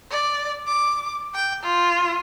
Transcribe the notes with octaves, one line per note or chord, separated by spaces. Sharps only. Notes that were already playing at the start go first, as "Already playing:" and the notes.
D5
D6
G5
F4